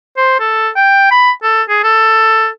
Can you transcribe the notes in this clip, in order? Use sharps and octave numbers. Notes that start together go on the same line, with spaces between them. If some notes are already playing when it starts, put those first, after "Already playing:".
C5
A4
G5
B5
A4
G#4
A4